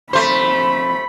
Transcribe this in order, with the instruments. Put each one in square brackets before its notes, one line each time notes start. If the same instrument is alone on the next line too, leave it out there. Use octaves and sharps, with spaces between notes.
[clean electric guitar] F2 C6 [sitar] A3 C5 [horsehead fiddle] B5